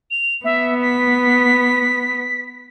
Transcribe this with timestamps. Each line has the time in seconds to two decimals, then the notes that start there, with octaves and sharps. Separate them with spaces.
0.11 F7
0.45 B3 E5
0.81 B6